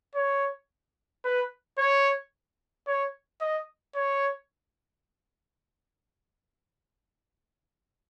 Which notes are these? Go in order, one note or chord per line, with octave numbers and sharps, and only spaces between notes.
C#5
B4
C#5
C#5
D#5
C#5